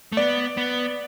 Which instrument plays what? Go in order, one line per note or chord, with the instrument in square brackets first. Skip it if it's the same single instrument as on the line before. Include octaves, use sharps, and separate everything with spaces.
[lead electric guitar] A3
[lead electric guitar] B3 [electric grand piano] D5
[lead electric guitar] B3